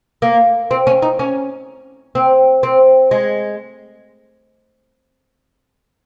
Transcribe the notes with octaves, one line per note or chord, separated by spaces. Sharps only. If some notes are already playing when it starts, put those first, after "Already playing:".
A#3
C4
C#4
D#4
C#4
C4
C4
G#3